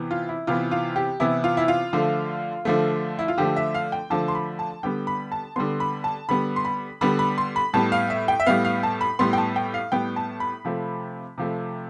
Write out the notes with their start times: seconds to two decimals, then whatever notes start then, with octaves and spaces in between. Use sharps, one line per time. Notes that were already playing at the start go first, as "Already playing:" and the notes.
Already playing: C3 E3 B3
0.11 F4
0.29 E4
0.47 C3 E3 B3 F4
0.71 F4
0.96 G4
1.20 C3 E3 B3 E4
1.44 F4
1.57 E4
1.68 F4
1.93 D3 F3 A3
2.65 D3 F3 A3
3.19 E4
3.28 F4
3.38 D3 F3 A3 G4
3.56 E5
3.74 F5
3.92 G5
4.10 D3 F3 A3 A5
4.28 C6
4.35 B5
4.59 A5
4.83 D3 G3 B3 G5
5.07 B5
5.32 A5
5.56 D3 G3 B3 C6
5.80 B5
6.04 A5
6.29 D3 G3 B3 B5
6.56 C6
6.65 B5
7.01 D3 G3 B3 B5
7.19 B5
7.38 C6
7.56 B5
7.74 A2 G3 B3 A5
7.92 F5
8.10 E5
8.28 G5
8.40 E5
8.46 A2 G3 B3 F5
8.65 F5
8.83 A5
9.01 B5
9.19 A2 G3 B3 C6
9.33 G5
9.38 A5
9.56 G5
9.74 F5
9.92 A2 G3 B3 G5
10.16 A5
10.40 B5
10.65 C3 F3 A3
11.38 C3 F3 A3